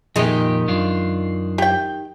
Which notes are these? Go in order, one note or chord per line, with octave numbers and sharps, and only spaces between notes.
F2 A#2 D#3 G#3 D#4 G4
F#2 D4 F4
G4 G5